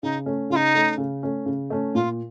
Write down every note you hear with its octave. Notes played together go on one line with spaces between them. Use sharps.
C#3 D#4
A3 C#4
C#3 F4
D#4
A3 C#4
C#3
A3 C#4
C#3
A3 C#4
A#2 F4